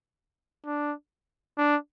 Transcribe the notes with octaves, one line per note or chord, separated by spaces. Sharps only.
D4
D4